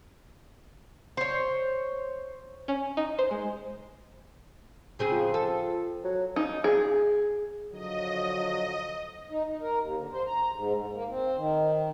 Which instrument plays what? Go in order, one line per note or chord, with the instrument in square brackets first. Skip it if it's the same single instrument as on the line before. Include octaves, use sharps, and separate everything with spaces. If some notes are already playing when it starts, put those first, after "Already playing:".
[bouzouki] C5 C#5
[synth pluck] C#4
D#4
C5
G#3
[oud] C#3 C4 G#4
[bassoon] F3
[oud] A4
[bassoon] F#3
[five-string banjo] D#4
G#4
[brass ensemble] D3 F3 F#3 [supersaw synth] D#5
[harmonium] D#4
D#4
A#4
D#2
D3
C5
A#5
G#2
G#2
A#3
C4
D#3